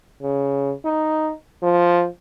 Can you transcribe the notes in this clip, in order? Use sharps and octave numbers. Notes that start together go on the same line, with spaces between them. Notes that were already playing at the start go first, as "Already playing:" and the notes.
C#3
D#4
F3